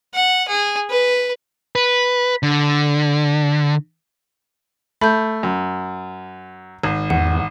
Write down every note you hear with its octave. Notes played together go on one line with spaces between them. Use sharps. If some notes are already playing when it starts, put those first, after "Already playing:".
F#5
G#4
B4
B4
D3
A3 B5 G6
F#2
G#1
E2 F#5